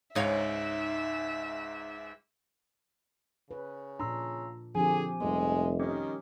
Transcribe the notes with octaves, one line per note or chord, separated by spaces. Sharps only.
C#2 G#2 G#3 D#4 C#5 E5 F5
C#3 B4
A#2 D4 A#5 C6 E6
D3 F3 C4 G4 G#4 G#5
F1 G3 G#3 B3
D#3 C#4 G4 A#4